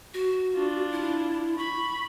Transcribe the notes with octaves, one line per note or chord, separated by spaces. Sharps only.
F#4
D4 F4
E4
B5 C#6